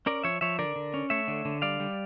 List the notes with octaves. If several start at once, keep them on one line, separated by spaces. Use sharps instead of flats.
C#4 A#4 D5
F3 C#5 E5
F3 C#5 E5
D3 A#4 D5
D3
C#4
A3 C#5 E5
D3
D3
G3 D5 F5
G3